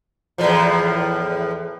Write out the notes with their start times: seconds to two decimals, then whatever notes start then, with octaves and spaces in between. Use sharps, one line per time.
0.38 E2 A2 F3